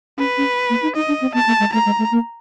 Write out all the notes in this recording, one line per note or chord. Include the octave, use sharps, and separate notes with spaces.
C#4 B4
C#4
A#3
D#4
D#4 D#5
D4
C4
B3 A5
A#3
G#3
A3 A#5
G#3
A3
A#3